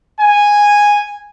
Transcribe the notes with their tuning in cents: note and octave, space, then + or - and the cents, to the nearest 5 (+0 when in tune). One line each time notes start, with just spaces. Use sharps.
G#5 -10